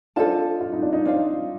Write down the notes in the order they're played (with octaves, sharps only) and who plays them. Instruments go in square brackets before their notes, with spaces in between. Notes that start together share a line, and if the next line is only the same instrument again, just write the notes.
[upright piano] D4 F4 [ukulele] A4 C5 D#5 A5
[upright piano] F4
D#4
D4
D#4
[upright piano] D4 [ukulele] F4 C5 F5